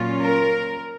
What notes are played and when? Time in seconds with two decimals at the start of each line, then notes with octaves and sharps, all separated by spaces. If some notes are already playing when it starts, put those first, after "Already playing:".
Already playing: A#2 F#3 C#4 F4
0.21 A#4